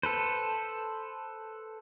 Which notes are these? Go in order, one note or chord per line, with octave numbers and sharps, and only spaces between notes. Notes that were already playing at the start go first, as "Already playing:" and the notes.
A4 B4 C5